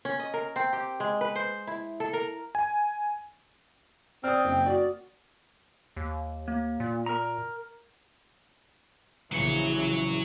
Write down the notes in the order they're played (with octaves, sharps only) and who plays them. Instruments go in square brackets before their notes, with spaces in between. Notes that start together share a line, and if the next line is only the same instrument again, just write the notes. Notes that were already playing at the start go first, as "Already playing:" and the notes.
[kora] C#4
D#5
A#4
C4
G4
G#3
B4
C5
E4
A4
A#4
[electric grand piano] G#5
[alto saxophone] C4 [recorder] D5 [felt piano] D#6 F6
[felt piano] F#1 [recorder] G5
[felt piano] F#4 [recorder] D5
[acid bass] D#2
[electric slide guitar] A#3
[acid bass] A#2
[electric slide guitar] A#4 A#5
[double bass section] A#1 C#3 E3 [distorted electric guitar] F#3 C#5